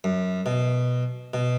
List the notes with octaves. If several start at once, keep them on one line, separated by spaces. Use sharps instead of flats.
F#2
B2
B2